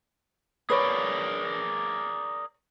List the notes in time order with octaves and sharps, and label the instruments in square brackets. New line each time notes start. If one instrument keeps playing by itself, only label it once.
[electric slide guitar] G#4 A#4 D5 [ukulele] B4 C#5